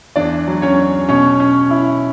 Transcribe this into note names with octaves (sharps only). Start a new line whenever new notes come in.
E2 D4 D5
F#3
C#4 C#5
C#4
B2 C#4 C#5
C#4
E4